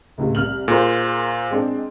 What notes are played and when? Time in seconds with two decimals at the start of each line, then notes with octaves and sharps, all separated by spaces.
0.18 C#2 A2 C3
0.35 C2 F6 F#7
0.68 A#2 G#4 A#4 C5
1.50 G#3 C4 D4